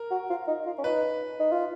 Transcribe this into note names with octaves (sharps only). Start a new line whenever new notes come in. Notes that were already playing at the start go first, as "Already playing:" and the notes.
Already playing: A#4
F#4
F4
D#4
F4
C#4
D#4 B4
D#4
F4